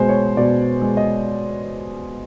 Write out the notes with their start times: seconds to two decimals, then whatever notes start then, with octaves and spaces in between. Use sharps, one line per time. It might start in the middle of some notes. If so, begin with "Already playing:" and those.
Already playing: B2 G#3 C5
0.09 C#5
0.37 B2 D5
0.82 G#3
0.97 D#5